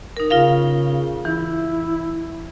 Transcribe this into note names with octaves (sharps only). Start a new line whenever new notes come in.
D#4 A#4
C#3 F4 A#4 F5
E3 E4